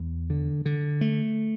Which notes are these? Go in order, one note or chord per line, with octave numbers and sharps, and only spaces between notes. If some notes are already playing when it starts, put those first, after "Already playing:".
Already playing: E2
D3
D3
A3